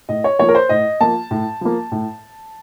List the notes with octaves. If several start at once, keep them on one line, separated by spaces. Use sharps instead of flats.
A2 D#5
C#5
F3 A#3 C#5
A#4
C5
A2 D#5
F3 A#3 A5
A2
F3 A#3
A2